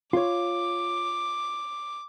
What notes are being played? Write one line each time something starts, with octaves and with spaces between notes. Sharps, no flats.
F4 C#5 D6